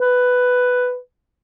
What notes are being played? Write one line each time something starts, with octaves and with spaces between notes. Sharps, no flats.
B4